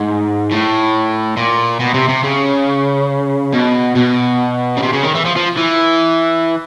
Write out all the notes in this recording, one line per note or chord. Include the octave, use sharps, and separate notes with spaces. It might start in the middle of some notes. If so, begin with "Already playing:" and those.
Already playing: G#2
A2
A#2
B2
C3
C3
C#3
B2
B2
C#3
C3
C#3
D#3
E3
F3
F3
E3